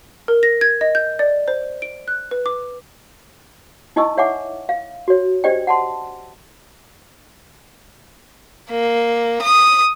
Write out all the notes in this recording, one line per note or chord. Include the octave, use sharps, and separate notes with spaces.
A#4
A#6
G#6
D#5
G6
D5
C5
D7
F#6
B4
D6
D#4 E4 D#5 G#5 C#6 E6
C#5 E5 F#5 G#5 D6
F5
F#4 C#5
D4 G4 C5 D5 D#5 G5
F#5 A5 C6
A#3
D#6